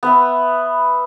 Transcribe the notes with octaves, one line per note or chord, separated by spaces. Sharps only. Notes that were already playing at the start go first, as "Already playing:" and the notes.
B3 B4 E5